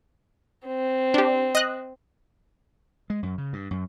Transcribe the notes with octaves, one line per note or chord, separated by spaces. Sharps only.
C4
D4 G4
D#5 F#6
G#3
F#2
C#3
G2
F#2